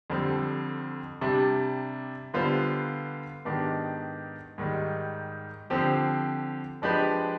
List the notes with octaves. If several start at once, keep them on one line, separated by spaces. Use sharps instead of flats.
F2 D3 G3 C4
C3 G3 D4
D3 G3 B3 F4 C5
G#2 D#3 B3 D4 G4
G#2 D#3 G3
D3 F3 C4 G4
F3 G#3 D4 G4 B4